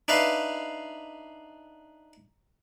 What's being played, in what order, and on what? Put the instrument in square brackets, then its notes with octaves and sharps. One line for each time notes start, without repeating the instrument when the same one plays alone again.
[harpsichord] D4 D#4 B4 E5 F5